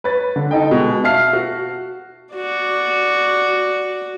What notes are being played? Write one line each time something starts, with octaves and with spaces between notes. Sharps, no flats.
B4 C#5 A6
D3
D#4 A4 D#5 G5
B2 G#3
E5 F5 A5 F6 C7
F#4
F#4 D5